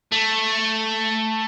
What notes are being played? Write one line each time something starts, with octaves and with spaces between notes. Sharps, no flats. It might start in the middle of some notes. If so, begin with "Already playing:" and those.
A3